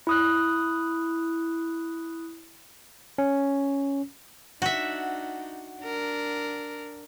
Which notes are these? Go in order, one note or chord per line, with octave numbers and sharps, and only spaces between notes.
E4 D#6 F#6
C#4
D4 D#4 F#4 E5 F#5
D4 A#4